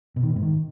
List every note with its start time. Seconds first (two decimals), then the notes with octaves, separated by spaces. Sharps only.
0.16 B2
0.23 D#3
0.29 B2
0.36 G#2
0.43 D#3